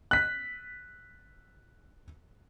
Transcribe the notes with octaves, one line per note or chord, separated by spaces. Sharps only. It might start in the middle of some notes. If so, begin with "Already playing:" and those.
F#6 B6